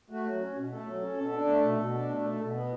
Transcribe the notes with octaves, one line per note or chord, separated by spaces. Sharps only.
A3 F#4
F#3
C#4
B2
A3 A4
F#3
C#4
B2
D4
A3
B2
B2
D4
A3
B2
B2
B3